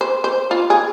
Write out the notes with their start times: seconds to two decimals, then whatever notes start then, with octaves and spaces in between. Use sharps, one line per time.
0.01 C5
0.24 C5
0.51 F4
0.70 G#4